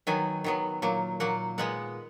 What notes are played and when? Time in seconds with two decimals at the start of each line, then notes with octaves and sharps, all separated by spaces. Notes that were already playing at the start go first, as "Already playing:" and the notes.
0.07 D#3 F#3 B3 G#5
0.44 D#3 F#3 B3
0.82 A#2 F#3 A#3
1.20 A#2 F#3 A#3 F#5
1.58 A#2 G#3 B3 F#5